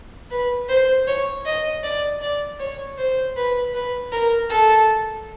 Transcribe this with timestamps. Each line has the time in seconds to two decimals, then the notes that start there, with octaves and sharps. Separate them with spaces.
0.31 B4
0.69 C5
1.07 C#5
1.45 D#5
1.83 D5
2.21 D5
2.59 C#5
2.98 C5
3.36 B4
3.74 B4
4.12 A#4
4.50 A4